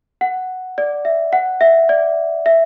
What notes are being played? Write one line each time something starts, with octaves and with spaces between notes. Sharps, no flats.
F#5
D5
E5
F#5
E5
D5
E5